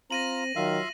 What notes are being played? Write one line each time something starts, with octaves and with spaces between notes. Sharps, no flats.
C4 F4 A#5 A#6 D#7 F#7
D#3 F#3 F4 E5 F5